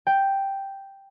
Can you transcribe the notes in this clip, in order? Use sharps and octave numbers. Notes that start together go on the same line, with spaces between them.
G5